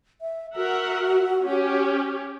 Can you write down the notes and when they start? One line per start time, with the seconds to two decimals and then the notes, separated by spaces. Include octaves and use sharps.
0.21 E5
0.56 F#4 A#4 E5 F#5
1.45 C#4 G4